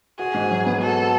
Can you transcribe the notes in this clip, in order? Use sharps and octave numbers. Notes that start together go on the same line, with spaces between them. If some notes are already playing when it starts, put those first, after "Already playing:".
F#4 G#4
G#2
F#3
B3
F#4 A4